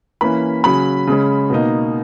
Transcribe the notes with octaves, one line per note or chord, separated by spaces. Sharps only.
E3 A#3 C#4 B5
C#3 F#3 C#4 B5
C#3 G#3 C#4
B2 A#3 D#4